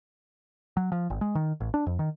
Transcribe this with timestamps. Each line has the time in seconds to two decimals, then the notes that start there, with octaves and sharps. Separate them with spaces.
0.77 F#3
0.92 F3
1.10 G#1
1.21 G#3
1.35 D#3
1.60 A1
1.74 D4
1.86 F2
1.99 D#3